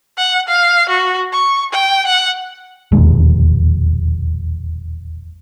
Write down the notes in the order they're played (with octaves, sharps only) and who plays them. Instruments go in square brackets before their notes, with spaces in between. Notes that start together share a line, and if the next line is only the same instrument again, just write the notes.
[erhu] F#5
F5
F#4
C#6
G5
F#5
[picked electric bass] E1 A#1 D#2 G#3